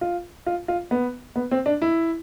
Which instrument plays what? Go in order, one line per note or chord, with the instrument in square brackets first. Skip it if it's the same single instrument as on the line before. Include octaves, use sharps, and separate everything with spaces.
[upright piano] F4
F4
F4
B3
B3
C4
D4
E4